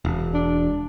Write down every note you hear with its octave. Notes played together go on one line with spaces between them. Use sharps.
E1
D4